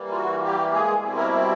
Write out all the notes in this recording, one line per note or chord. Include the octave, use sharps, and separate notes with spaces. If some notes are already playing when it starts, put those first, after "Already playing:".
Already playing: E3 G3 A#3
F4
F#4
G3 G4
G#3 G#4
B2 G3 C4 E4
A#3 A#4